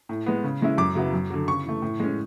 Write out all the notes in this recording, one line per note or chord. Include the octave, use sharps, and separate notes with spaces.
A2
G#3 B3
C#3
E3 G#3 C#4 E4
F#2 D6
C#3 F#3 B3 E4
F#2
D3 F#3
C#3 C#6
E3 A3
A2
G#3 C#4